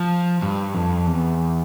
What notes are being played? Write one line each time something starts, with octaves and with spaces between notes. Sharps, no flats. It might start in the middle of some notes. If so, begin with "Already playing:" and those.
Already playing: F3
G2
F2
E2